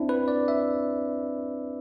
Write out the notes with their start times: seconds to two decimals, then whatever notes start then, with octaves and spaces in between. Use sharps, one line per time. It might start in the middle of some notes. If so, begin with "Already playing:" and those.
Already playing: C4 D4 E4
0.09 B4
0.28 D5
0.48 E5